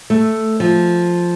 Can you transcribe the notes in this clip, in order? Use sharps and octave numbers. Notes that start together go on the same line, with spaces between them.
A3
F3